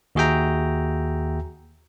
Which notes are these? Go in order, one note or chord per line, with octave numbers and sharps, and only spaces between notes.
D#2 F#4 G#4 E5 G5 A#5